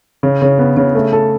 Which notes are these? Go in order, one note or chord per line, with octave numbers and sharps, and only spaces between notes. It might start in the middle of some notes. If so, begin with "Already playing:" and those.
C#3
C#3
B3
C#3
A3
A4